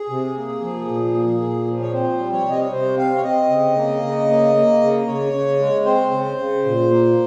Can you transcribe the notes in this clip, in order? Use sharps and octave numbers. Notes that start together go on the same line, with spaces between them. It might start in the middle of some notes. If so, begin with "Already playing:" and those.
Already playing: G#4
C3
A#3
F3
A#2
A#3
A#2
F3
C#5
C4 C5
G3
C#5
C3 D#5
C#5
C3 C5
C4 F5
C#5
C4 D#5
C#3
A#3
C#3
A#3
A#3
C#3
C#3 C#5
C#3
G#3
C4 C5
C#3
C#3
A#2
A#3